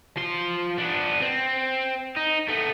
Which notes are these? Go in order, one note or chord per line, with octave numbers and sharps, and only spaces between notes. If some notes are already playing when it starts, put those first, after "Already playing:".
F3 C6
B3 D4
C4
D#4
A3 B3